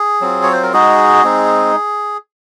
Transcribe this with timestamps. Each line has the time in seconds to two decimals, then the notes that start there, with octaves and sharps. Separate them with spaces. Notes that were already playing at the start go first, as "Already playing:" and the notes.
Already playing: G#4
0.21 F#3 C4 F4
0.43 C#5
0.53 C5
0.63 A#4
0.73 G#3 D#4 F#4 G#4
1.24 G#3 C4 D#4